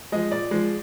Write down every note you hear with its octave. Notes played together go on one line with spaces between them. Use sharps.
F3 G#3 D#5
A#2 D5
F3 G#3